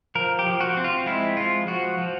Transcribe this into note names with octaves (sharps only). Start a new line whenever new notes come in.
F3 A#4
G4
F3
F#4
C4
F4
G#3 E4
F3 F4
F3 F#4
F3